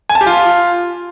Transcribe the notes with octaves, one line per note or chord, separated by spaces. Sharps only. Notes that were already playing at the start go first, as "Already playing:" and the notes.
G#5
A5
G4
F4